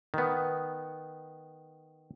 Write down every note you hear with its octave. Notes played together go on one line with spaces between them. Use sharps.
D#3 B3